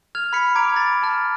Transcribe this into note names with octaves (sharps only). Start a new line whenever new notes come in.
F6 G#6 F7
B5 F6 B6 C#7
A#5 D6 G#6 D7
B5 A6
A5 F6